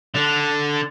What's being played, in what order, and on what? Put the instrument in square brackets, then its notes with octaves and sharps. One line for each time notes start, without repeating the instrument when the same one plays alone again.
[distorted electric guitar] D3 D4